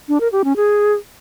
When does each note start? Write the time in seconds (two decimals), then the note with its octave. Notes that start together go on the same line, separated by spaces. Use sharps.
0.08 D4
0.20 A#4
0.32 G4
0.44 C#4
0.56 G#4